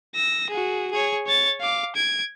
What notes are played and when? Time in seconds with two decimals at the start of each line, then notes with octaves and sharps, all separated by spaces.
0.15 E6 A#6
0.50 F#4 G#4
0.91 G#4 C#5
1.26 C#5 A6
1.61 F5 D6
1.96 G#6 D7